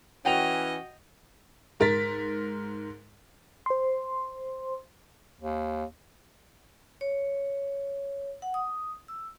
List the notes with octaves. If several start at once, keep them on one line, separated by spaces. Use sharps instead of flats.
E3 C#4 F#4 D#5 G5 F7
G#2 A#4 A6 B6
C5 C6
D#2
C#5
F#5
D#6
E6